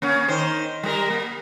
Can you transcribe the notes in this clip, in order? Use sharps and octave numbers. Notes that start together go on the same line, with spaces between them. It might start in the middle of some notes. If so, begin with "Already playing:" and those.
A#3 C#4
D#3 C5
G3 A#4
A#3